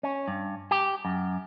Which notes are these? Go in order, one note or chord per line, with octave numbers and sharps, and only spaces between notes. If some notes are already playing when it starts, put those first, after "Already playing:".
C#4
G2
G4
F#2